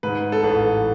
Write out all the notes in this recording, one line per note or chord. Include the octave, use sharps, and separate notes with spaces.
G#2 B4
A4
A1 B4